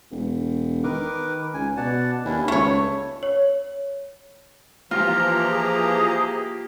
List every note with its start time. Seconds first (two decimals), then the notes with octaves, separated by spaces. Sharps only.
0.11 E1
0.84 D#3 A#4 B4 D6
1.54 C#2 G#5
1.77 B2 D5 F#5 A5
2.25 D#2 C#4 D4 E4
2.48 C#2 G3 A3 C#5
3.23 C#5
4.91 E3 F3 A#3 F4 G4 A#5
5.48 G#4